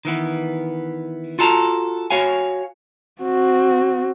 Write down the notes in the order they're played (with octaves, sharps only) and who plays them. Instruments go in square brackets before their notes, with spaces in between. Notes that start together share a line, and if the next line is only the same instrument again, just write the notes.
[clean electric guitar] D#3 E3 B3
F4 F#4 A4 A5 A#5
F#4 C#5 F5 G#5
[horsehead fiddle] C4 F#4